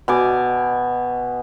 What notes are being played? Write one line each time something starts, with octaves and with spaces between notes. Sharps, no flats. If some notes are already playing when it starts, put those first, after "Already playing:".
B2 G#5 D6